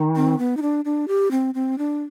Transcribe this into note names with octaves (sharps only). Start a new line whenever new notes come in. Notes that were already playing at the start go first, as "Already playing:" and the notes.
Already playing: D#3
C4
B3
D#4
D4
D4
G4
C4
C4
D4